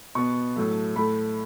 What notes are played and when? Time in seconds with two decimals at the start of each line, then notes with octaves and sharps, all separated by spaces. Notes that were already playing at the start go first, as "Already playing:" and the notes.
0.15 B2 B3 C#6
0.56 A2 F#3 A3
0.96 A2 A3 B5